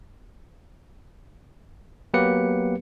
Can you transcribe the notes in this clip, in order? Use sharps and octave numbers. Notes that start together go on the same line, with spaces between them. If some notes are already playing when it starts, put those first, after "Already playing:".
F#3 A#3 B3 G4 B4 C#7